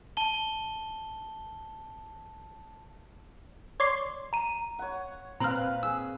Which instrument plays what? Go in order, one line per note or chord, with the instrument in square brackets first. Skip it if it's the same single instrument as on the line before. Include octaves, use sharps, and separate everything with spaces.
[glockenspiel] A5 G7
[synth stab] C#5 D5 C6
[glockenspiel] A#5 D#7
[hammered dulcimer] C#5 F#5
[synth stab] A#2 C4 F#6 [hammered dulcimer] B4 F5 [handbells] A#5 F6
[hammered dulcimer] G#4 [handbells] E6